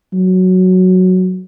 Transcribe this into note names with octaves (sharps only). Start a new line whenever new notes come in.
F#3